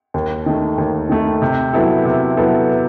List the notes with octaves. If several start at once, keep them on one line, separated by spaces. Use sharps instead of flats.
D#2
D#3 A3
D#2
D#3 A3
C3
F#3 B3 E4 A4
C3
F#3 B3 E4 A4